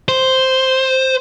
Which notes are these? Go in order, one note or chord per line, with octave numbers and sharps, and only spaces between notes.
C5